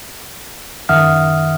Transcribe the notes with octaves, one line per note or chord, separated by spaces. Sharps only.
F#2 D#3 E5 F#5 D#6 F6